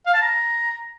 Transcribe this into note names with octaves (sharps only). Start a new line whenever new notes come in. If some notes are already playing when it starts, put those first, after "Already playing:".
F5
A5
A#5